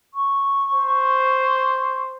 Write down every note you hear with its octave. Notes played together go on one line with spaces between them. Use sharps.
C#6
C5